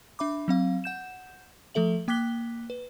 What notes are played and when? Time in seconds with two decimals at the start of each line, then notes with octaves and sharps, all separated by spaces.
0.19 D4 E5 B5 D6
0.48 F#3 C4 F5
0.84 F#5 G6 E7
1.75 F3 A3 A4 E5 F#7
2.08 A#3 G5 D6 F#6 B6 G7
2.70 B4